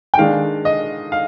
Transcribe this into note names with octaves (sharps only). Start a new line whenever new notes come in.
G5
D#3 G#3 D4 F5
D#5
F5